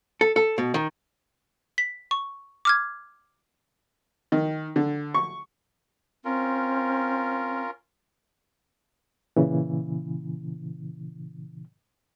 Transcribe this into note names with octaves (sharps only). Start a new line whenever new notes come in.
A4
A4
B2
D#3
B6
C#6
D6 F6 G#6
D#3
D3
C#6
C4 C#4 F4 A#4
A#2 C#3 E3